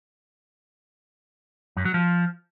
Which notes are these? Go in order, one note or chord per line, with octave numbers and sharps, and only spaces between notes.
F#2
F#3
F3